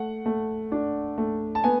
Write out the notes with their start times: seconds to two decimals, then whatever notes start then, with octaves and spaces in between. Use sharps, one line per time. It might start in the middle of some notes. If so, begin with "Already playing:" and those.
Already playing: A3 F#5
0.26 A3
0.72 D4
1.18 A3
1.55 A5
1.64 B3 G#5